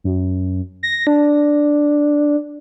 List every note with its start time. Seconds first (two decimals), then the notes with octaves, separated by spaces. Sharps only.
0.04 F#2
0.83 A#6
1.07 D4